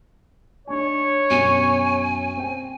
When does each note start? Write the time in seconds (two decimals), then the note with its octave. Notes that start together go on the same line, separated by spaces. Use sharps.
0.67 D4 D#4 C#5 G#5
1.30 F#2 B2 G#5
2.37 C4 G5